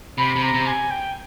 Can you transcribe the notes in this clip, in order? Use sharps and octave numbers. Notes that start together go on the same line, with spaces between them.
C3 B5
C3
A#5
C3
G#5
G5